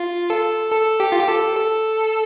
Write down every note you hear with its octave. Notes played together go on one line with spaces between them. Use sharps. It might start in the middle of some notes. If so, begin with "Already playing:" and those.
Already playing: F4
A4
A4
G4
F4
G4
A4
A4